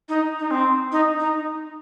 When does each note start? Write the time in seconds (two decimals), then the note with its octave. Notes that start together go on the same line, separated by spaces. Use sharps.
0.09 D#4
0.39 D#4
0.51 C4
0.92 D#4
1.19 D#4